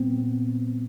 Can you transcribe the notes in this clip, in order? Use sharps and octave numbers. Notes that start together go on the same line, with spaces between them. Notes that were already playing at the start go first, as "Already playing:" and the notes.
Already playing: A#2 G3 B3 C4